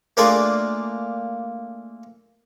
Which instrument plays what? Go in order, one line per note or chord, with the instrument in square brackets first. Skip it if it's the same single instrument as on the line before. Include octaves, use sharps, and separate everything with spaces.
[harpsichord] A3 A#3 D4 F4 G#4 D5